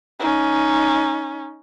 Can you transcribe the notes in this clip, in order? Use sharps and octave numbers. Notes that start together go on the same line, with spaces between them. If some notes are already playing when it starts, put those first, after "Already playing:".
C#4 D#4